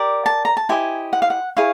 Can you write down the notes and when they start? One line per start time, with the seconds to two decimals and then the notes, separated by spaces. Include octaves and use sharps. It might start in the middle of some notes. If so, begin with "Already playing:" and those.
Already playing: G4 A#4 D5
0.26 A5
0.45 A#5
0.57 A5
0.69 E4 G4 C5 D#5 G#5
1.13 F#5
1.22 F5
1.30 F#5
1.57 E4 G#4 C#5 F5